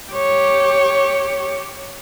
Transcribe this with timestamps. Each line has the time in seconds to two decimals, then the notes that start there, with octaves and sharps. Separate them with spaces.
0.12 G4 C#5